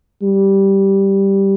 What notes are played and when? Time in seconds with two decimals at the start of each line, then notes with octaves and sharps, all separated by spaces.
0.23 G3